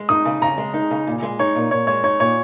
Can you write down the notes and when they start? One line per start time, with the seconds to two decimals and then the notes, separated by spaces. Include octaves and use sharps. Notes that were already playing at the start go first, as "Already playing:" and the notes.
Already playing: G#3
0.09 D#4 D#6
0.25 C#3
0.42 C#3 A#5
0.58 G#3
0.74 D#4
0.91 C#3
1.07 A#2
1.22 G#3
1.39 D#4 C#5
1.56 A#2
1.71 A#2 C#5
1.87 G#3 C#5
2.04 D#4 C#5
2.20 A#2 C#5